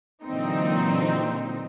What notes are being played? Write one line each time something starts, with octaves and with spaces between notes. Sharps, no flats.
A#2 D3 E3 F#3 C4 D#4